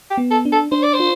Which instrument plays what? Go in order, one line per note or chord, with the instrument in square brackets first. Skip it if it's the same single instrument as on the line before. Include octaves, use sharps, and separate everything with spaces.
[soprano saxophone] G4
[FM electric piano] B3
[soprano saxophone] A4
[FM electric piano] D4
[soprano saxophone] A4
[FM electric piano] D4 [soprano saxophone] C5
[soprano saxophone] D5
C5
[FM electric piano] F4